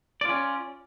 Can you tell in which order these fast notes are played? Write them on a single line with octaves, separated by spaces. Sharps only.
D5 F4 C#4